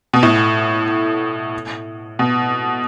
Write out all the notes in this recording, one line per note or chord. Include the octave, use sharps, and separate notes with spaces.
B2
A2
B2